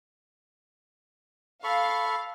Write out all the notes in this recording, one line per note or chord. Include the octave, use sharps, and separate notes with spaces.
A4 F5 B5 C#6